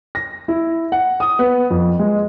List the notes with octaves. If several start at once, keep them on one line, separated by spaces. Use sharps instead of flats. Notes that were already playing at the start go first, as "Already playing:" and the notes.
A#6
E4
F#5
D#6
B3
F2
G#3